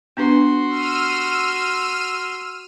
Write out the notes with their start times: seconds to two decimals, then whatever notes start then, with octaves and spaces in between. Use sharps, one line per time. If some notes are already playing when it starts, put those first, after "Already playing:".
0.17 B3 D4 F#4 B4 C6
0.69 E6 F6 D#7